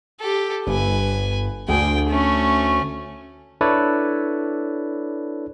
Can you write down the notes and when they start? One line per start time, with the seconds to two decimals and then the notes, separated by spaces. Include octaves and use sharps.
0.20 G4 A4
0.67 G1 B4 G#5
1.68 D2 G#4 G5
2.09 A3 C#4
3.61 D4 E4 A4 B4 C#5 D5